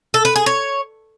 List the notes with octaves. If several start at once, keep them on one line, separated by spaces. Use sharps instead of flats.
A4
B4
G#4
C#5